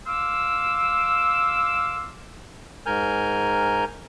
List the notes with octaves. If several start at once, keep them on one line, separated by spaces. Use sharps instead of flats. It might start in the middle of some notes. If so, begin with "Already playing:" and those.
F5 C6 D6 E6
G#2 A#4 G#5 F6 G6